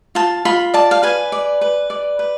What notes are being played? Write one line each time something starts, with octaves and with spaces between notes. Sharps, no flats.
F4 A5
F4 B5
D5 A5
F5
B4 G#5
D5
B4
D5
B4